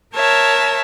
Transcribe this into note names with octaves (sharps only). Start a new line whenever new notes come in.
A#4 C#5 E5 A5